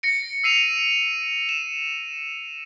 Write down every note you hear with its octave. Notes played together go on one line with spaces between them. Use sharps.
A#6 C#7 D7
E6 C7 D#7 F7
E7